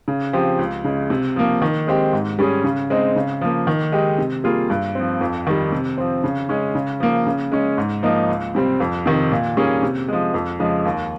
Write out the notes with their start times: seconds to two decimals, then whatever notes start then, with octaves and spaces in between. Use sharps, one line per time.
0.08 C#3
0.33 F3 C4 G4
0.59 C#2
0.84 C#3 G#3
1.10 C3
1.36 F3 A#3
1.62 D#3
1.87 G#3 C4 G4
2.13 G#2
2.39 G3 C#4 G#4
2.64 C#3
2.90 G#3 C4 D#4
3.16 C#3
3.41 F3 A#3
3.67 D#3
3.92 G#3 D#4 G4
4.18 C3
4.44 G3 A#3 F4 G#4
4.70 G2
4.95 F3 C4
5.21 F2
5.47 D#3 G3
5.72 C3
5.98 F3 C4
6.24 C#3
6.49 G#3 C#4
6.75 C#3
7.00 F3 A#3
7.27 C#3
7.52 G#3 C#4
7.78 G#2
8.03 F3 A#3 D#4
8.29 C#2
8.55 C3 G3 C4
8.80 F2
9.06 C3 D#3
9.32 A#2
9.57 G3 A#3 C#4 G#4
9.83 C3
10.08 F3 G#3
10.34 F2
10.59 C#3 F3 G#3
10.85 D#2